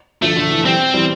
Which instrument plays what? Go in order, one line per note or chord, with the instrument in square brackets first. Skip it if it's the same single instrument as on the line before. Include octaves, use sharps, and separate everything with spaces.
[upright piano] D3 F3 [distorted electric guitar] A3
[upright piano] D3
E3
[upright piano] E3 G3 [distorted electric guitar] C4
[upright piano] E3 G3